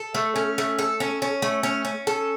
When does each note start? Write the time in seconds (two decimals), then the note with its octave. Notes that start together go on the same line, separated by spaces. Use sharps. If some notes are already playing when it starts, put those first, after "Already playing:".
Already playing: A4
0.15 A3
0.36 C#4
0.58 A3
0.79 A4
1.00 C#4
1.22 C#4
1.42 A3
1.63 C#4
1.85 C#4
2.07 A4